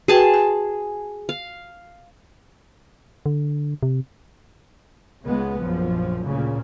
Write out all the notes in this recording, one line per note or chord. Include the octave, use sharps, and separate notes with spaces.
F#4 G#4 B4 G5 A5 C6
G#5
F5
D3
C3
C#2 C#3 G#3 B3
A#1 F#2 F3
D2 A#2 C#3